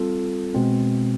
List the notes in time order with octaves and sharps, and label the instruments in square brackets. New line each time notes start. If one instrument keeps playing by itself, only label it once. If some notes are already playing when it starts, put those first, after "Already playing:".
Already playing: [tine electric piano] G3 C4 F4 A4
B2 G#3 C4